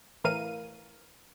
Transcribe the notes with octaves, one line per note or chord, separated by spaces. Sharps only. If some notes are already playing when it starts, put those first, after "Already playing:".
A2 E3 A#4 F5 D#7